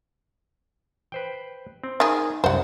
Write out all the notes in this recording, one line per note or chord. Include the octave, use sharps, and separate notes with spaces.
B4 C5 G5
C4
D#3 G#4
C2 F#2 C5 F#5